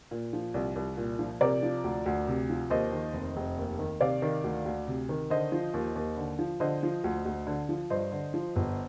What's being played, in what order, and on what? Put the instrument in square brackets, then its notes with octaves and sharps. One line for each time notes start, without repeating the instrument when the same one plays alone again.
[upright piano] A#2
F3
C2
C2
A#2
F3
C3 A#4 D5
F3
D2
D2
C3
F3
D#2 C5 D#5
D#3
F1
F1
D#2
D#3
C3 D5 F5
D#3
D2
D2
C3
D#3
D3 C5 D#5
F3
D#2
D#2
D3
F3
D3 C5 D#5
F3
D2
D2
D3
F3
G2 C5 D#5
D3
F3
G1